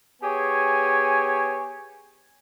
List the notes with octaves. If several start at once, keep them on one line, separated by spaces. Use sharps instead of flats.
B3 G4 G#4 C#5 G#5